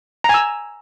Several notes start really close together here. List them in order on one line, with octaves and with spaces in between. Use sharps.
A#5 G#5 E6